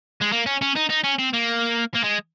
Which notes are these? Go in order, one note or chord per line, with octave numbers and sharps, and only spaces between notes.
G#3
A#3
C#4
C#4
D#4
D#4
C#4
C4
A#3
A#3
G#3